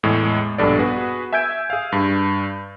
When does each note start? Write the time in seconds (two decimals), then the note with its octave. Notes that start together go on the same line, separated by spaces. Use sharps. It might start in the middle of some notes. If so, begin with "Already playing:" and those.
0.03 E2 A2 G#3
0.58 A#1 G2 B2 A4 D5
0.79 B3 F#4 G#4 B4
1.33 E5 G#5 E6 G6 G#6 D7
1.70 G#4 F5
1.92 G2